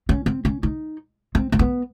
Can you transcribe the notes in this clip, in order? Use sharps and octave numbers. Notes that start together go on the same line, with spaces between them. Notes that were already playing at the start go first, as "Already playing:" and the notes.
C#4
C4
C#4
D#4
C4
C4
B3